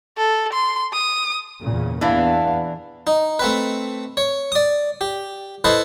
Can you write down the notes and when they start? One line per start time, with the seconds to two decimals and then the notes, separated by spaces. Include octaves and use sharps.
0.18 A4
0.53 C6
0.93 D#6
1.61 E2 A#2 C#3
2.01 E2 E3 B3 D4 E4 F5
3.07 D#4
3.39 A3 C4 B4
4.17 C#5
4.52 D5 D#6
5.01 G4
5.64 E4 A4 B4 C5 D#5